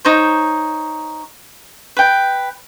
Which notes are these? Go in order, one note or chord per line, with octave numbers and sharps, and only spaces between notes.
D#4 C5 C#5
B4 G5